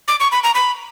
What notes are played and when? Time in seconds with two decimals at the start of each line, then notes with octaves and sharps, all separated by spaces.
0.08 D6
0.20 C#6
0.32 B5
0.43 A#5
0.55 B5